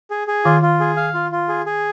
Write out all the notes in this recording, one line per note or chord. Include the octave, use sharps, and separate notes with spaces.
G#4
G#4
D#3 F4
F4
G#4
F5
F4
F4
G#4
G#4